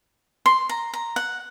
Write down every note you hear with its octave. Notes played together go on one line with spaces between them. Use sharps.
C6
A#5
A#5
F#5